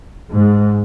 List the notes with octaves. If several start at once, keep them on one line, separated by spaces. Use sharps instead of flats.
G#2